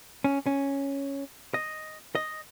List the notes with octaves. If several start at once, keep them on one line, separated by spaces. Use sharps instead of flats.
C#4
C#4
D#5
D#5